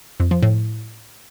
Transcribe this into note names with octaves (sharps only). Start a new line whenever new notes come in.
F2
F3
A2